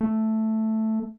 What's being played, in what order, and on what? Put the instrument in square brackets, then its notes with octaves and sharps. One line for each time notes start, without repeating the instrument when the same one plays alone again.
[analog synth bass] A3